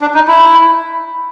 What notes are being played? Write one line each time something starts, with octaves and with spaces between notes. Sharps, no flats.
D4
D#4
E4